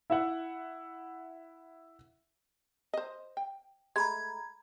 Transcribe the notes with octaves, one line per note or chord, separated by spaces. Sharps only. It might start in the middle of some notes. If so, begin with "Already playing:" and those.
E4 E5 F#5
C5 D#5
G5
G#3 A3 A#5 B5 G#6